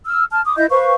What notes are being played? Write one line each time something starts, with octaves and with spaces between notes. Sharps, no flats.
E6 F6
A5 F6
D6 D#6
E4 D#5 E5 G6
B4 C5 F5 C#6